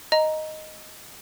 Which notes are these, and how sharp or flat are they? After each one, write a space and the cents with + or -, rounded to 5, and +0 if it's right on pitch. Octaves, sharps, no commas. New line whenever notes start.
D#5 +0 A#5 +0